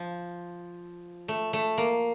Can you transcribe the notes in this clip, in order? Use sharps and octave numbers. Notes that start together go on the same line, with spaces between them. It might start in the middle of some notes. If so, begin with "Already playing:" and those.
Already playing: F3
A3
A3
A#3